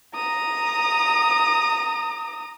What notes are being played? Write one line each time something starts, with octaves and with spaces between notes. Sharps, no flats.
A#5 D#6